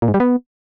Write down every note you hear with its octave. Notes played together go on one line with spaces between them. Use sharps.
A#2
G#2
G3
B3